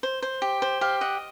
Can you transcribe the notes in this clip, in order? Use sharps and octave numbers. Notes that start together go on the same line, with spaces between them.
C5
C5
G4
C5
G4 F5
D#5 F#5